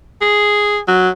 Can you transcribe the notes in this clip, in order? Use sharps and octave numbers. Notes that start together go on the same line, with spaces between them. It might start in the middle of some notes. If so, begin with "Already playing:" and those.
G#4
F#3